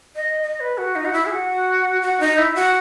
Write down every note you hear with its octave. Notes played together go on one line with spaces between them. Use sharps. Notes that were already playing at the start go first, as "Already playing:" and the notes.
D#5
D#5
B4
F#4
D#4
F#4
E4
G#4
F#4
F#4
D#4
E4
F#4